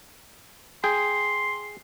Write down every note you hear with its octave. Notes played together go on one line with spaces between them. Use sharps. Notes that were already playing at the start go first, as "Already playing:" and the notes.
G#4 G5 C6